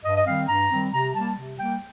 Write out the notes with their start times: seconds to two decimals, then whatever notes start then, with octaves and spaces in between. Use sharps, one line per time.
0.04 G2 D#5
0.16 D#5
0.26 D#3 G3 C4 F5
0.49 G2 A#5
0.71 D#3 G3 C4
0.93 C3 A#5
1.15 G3 A#3 A5
1.38 C3
1.60 G3 A#3 G5